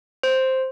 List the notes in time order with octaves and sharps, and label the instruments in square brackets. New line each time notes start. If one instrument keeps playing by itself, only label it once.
[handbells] C5